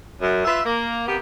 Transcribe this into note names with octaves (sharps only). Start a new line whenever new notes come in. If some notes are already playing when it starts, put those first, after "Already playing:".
F#2
F4 B4 E5
A#3
C3 A#3 B3 G4